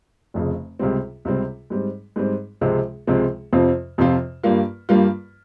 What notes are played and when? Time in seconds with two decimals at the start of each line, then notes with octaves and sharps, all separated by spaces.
0.34 F1 F2 C#3
0.79 C#2 C3 G3 C4
1.25 C#2 C3 G3 C4
1.70 G#2 G3 C4
2.16 G#2 G3 C4
2.61 C#2 C3 F3 G#3 C4
3.07 C#2 C3 F3 G#3 C4
3.53 F2 C3 F3 C4 F4
3.98 F2 C3 F3 C4 F4
4.43 G2 G3 A#3 F4
4.89 G2 G3 A#3 F4